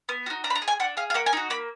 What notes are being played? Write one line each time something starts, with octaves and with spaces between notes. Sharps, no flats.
B3
D#4 F#4
D4 A#5
B5
A#5
G#4
G#5
D4 F#5
G#4 F5
F5
A#3 F#5
G#5
D#4 F#4
A#3 B5